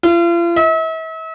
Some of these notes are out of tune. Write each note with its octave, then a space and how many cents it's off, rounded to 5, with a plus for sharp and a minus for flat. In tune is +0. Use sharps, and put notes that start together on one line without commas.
F4 -40
E5 -40